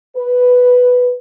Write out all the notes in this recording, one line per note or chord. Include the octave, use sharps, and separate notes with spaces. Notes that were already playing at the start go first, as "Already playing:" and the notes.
B4